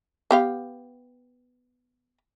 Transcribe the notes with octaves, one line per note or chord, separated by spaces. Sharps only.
B3 G4 F5